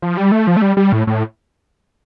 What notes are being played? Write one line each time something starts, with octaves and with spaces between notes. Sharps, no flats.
F3
G3
A3
F3
A3
G3
G3
A2
A2